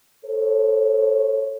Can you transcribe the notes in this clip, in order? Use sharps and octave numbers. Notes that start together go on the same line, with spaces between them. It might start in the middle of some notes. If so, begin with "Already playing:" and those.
A4 C5 C#5